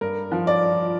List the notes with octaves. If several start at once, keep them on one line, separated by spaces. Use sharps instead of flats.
G2 A#4
F3
D5